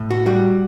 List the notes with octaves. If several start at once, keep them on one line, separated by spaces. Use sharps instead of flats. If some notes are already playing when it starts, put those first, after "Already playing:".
Already playing: A2
F#4
G3 F#4